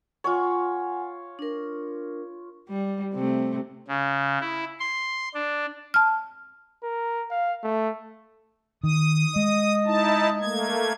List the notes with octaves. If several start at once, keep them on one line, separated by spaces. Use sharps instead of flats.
F4 C#5 F#5 G#5
D4 A#4
G3
C3 A3
C#3
E4
C6
D4
A5 F6
A#4
F5
A3
D#3 D#6
G#3 D#5
D#4 E4 A5
A3 A#3 G#6